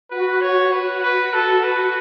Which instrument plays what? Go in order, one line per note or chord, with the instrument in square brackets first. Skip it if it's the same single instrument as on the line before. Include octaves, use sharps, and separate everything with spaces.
[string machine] F#4 [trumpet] B4
[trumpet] C#5
B4
B4
A4
B4